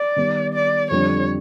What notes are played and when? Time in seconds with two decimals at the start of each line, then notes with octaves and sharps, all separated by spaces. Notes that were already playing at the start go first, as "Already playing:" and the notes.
Already playing: D5
0.16 D#3 G3 B3
0.53 D5
0.90 F2 D3 G3 C#5